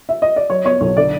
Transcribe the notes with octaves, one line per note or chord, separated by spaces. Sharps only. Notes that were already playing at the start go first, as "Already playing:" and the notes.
E5
D#5
D5
F#3 C#5
B3 C#5
B1 C#5
D3 D5